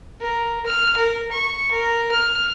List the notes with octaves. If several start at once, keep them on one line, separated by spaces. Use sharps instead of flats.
A#4
F6
A#4
C#6
A#4
F6